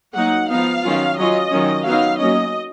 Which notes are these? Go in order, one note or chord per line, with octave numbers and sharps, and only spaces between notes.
F#3 A#3 D#4 F#5
F3 B3 D#4 F5
D#3 F#3 C#4 F4
F#3 C#4 F4 D#5
D#3 F#3 C#4 F4
F#3 B3 D#4 F5
F#3 A#3 C#4 D#5